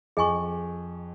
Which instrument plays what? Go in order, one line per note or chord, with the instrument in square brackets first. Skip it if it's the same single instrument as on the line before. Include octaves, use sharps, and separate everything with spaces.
[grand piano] F2 [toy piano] G#4 D#5 G#5 C#6